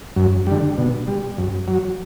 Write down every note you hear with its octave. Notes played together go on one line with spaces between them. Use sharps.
F#2
D3 G3
B2
G3
F#2
F#3